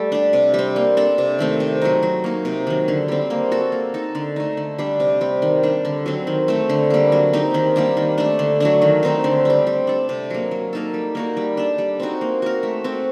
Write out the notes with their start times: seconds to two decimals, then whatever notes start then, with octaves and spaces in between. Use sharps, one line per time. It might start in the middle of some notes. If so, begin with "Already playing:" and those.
Already playing: G3 A3 A4
0.12 D4 G4
0.33 C3
0.54 G3 C4
0.76 A#3
0.97 D4 A4
1.18 C3
1.39 D#3 A3 C4
1.60 C3
1.81 F#3 A3 D#4
2.03 F#3
2.24 A#3 D#4
2.45 C3
2.67 D#3 F#3
2.88 D3
3.08 G3 C4
3.30 A#3
3.52 F#4 A4
3.72 A#3
3.94 D#4 A4
4.15 D3
4.36 A3 D#4
4.57 D3
4.79 G3 D4
5.00 C3
5.21 G3 C4
5.42 D#3
5.63 G3 D4
5.85 D3
6.06 F#3 C4
6.27 D#3
6.48 A3 C4
6.70 D3
6.90 G3 A#3
7.12 F#3
7.33 C4 D#4 G4
7.54 D#3
7.76 G3 A#3 D4
7.97 D#3
8.18 A3 D4
8.39 D3
8.60 F#3 A3 D4
8.82 D#3
9.03 A3 C4 D#4
9.24 D3
9.45 G3 C4
9.67 G3
9.87 D4 A4
10.09 C3
10.30 F#3 A#3
10.51 F#3
10.73 A#3 D#4 A4
10.94 G3
11.15 A#3 D#4 F#4
11.37 G3
11.57 D4 A4
11.78 G3
12.00 C4 D#4 F#4
12.21 A#3
12.42 F#4 A#4
12.63 A3
12.84 C4 F#4